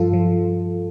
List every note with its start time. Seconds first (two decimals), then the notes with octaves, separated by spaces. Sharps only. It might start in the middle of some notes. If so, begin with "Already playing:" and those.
Already playing: G2 F3 F4 A4
0.13 F3